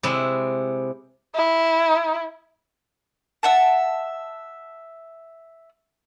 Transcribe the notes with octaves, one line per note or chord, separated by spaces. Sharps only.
C3 G#3 E4
E4
E5 F#5 A5